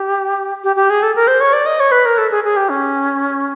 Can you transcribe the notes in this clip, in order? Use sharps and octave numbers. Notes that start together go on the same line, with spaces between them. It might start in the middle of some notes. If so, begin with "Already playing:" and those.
Already playing: G4
G4
G4
G#4
A4
A#4
C5
C#5
D5
D#5
C#5
B4
A#4
A4
G#4
G#4
G4
C#4